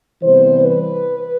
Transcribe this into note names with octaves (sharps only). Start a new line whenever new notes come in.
C3 E3 G3 B3 C5
B4